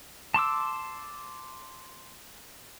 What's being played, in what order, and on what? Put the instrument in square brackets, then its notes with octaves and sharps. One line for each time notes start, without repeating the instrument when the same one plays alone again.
[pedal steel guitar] A5 C6 D6 E6